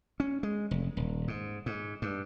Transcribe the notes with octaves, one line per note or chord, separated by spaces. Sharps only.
C#4
G#3
F1
D#1
G#2
G#2
G2